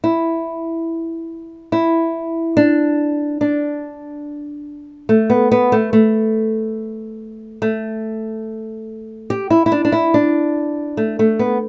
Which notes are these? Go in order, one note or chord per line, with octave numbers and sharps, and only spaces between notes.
E4
E4
D4
D4
A3
B3
B3
A3
A3
A3
G4
E4
E4
D4
D4
E4
D4
A3
A3
B3